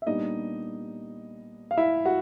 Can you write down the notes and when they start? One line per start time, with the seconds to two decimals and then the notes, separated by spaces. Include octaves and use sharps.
0.02 E5
0.07 A#2 G3 B3 D4 D#4 D#5
1.71 F5
1.77 E4 E5
2.05 F#4 F#5